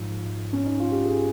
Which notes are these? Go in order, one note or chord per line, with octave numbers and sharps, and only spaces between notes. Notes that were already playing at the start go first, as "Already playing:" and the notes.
Already playing: G#2 F3
C#4
D#4
F4
G4
G#4